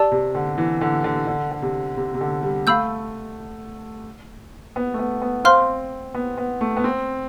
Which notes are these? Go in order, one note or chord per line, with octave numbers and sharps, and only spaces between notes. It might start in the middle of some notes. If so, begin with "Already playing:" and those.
Already playing: G4 D5 A5 E6
C3
D3
E3
D3
D3
D3
D3
C3
C3
C3
D3
G3
A3 F5 B5 E6 G6
B3
A3
B3
B3
C4 C5 F5 C6 F6
B3
B3
A3
B3
C4